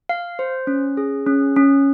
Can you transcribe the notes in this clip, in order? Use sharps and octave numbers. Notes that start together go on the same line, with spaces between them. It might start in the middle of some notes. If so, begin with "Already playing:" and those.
F5
C5
C#4
G#4
C#4
C#4